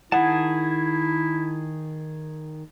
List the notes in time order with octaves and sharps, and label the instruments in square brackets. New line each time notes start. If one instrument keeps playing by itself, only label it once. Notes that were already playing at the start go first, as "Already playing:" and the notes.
[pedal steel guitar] D#3 G#4 A5 [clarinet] E4 [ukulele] F#5